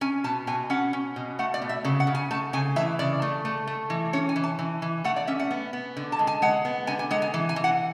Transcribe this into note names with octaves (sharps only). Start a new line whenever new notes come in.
C#4 G#5
B2 A5
B2 G#5
C#4 F#5
C#4
B2
A3 F#5
D5
B2
E5
C#3 A4
F#5
C#3
G#5
A3 A5
C#3 G#5
E3 E5
C#3 D5
A3
A3
A3
E3
C#4 C#5
G#5
E3
A5
E3
E3
A3 F#5
D5
C#4 E5
F#5
B3
B3
D3
A5
G#3
G#5
G#3 F#5
B3
D3 G#5
G#5
G#3 F#5
G#5
E3
G#5
E3
F#5